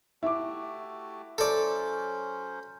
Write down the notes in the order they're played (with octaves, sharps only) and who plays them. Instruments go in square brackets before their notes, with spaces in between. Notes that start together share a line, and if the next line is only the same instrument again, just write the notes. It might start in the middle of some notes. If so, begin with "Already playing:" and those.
[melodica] A3 F#4 G4 [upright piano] E4 D6
[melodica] F#3 C#4 C5 [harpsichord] A4 D5